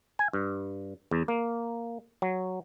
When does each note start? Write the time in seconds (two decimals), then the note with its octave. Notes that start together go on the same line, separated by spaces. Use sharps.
0.19 G#5
0.33 G2
1.11 E2
1.28 A#3
2.22 F#3